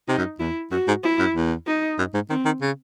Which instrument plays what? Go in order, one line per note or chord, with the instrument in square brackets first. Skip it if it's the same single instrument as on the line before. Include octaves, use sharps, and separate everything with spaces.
[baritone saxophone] C3 [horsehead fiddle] D#4
[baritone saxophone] F#2
[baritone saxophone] E2 [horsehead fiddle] E4
[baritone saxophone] F#2 [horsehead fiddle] F#4
[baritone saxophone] G#2
[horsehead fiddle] E4
[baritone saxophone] F#2
E2
[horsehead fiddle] D#4
[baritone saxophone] F#2
G#2
[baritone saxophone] D#3 [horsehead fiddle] C4
[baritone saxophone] D#3
C#3